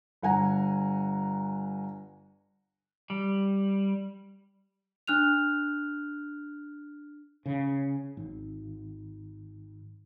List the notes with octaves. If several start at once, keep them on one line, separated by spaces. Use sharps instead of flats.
G1 F#5 G#5 A#5
G3
D4 F6 F#6 F7
C#3
G#1